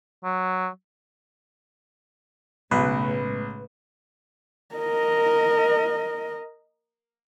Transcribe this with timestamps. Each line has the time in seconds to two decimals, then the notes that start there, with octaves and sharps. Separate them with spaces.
0.24 F#3
2.71 B1 A2 C#3 G#3 B4
4.75 A#4 D#5